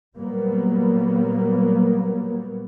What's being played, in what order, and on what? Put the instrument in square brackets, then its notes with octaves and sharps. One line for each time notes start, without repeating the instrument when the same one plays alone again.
[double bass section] A#2 F#3 G3 A#3 B3